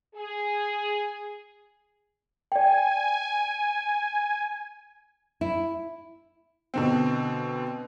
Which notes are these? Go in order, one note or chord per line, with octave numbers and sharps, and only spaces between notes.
G#4
D5 G5 G#5
E4
B2 D3 C4